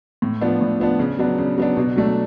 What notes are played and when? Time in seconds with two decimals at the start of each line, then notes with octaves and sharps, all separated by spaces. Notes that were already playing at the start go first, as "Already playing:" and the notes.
0.22 A2
0.41 F3 B3 D4
0.61 A2
0.80 F3 B3 D4
0.99 C#3
1.19 F#3 B3 D4
1.38 C#3
1.58 F#3 B3 D4
1.77 B2
1.96 F#3 A3 D4